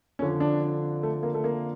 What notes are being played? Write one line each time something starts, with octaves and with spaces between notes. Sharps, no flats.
F2 D3 F3 C#4
D4
A3
A#3
A3
A#3